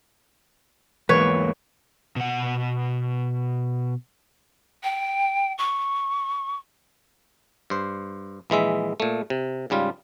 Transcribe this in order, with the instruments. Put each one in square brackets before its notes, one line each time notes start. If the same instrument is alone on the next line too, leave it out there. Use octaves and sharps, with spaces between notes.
[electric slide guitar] E2 G#2 A#3 [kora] B4 C#5
[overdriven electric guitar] B2 F#5
[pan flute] G5
C#6
[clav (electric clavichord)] G2 C5
A#1 E3 G#3 E5
A#2 A3
C3
G#2 C#3 G3 F4